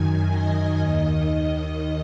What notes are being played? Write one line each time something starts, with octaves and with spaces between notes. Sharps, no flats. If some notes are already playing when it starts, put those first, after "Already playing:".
Already playing: F#2 D#3 G#5
D#5
D#2 D#3